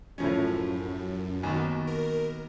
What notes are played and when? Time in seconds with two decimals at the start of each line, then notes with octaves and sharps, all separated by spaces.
0.18 F#2 A2 F3 C#4
1.43 D#2 B2
1.87 A#4